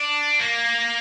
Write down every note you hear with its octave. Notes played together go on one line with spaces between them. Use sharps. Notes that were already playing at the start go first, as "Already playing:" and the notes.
Already playing: D4
A#3